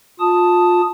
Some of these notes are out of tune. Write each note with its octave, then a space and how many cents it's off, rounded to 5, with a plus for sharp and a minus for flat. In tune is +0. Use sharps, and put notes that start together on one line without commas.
F4 +25 A5 +0 D#6 +0